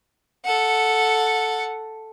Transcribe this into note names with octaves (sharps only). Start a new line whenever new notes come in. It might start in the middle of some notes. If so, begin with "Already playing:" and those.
A4 F#5